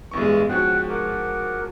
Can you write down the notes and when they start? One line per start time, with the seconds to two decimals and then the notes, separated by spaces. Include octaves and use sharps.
0.11 A1 G2 E3 G#3 B3 C#6
0.49 G#2 F3 C#4 F#4 F#5 G5 F#6
0.89 A#4 F#5 D6